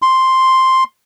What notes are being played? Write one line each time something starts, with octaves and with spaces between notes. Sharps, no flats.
C6